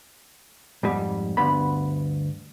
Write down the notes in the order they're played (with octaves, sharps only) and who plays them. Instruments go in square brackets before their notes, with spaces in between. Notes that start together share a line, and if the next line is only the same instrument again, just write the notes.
[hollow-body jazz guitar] F2 G#2 G3
D2 G2 B3 B5